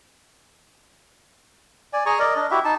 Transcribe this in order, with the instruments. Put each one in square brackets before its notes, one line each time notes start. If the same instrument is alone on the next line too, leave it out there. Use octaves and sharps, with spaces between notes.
[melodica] D5 G#5
G#4 G#5 A#5 C#6
A#4 D5 D#5
D4 D#5
E4 F#4 G4 E5
D#4 A5